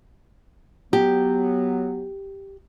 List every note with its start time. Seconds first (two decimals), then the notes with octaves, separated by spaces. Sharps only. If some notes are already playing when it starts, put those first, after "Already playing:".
0.93 F#3 B3 G4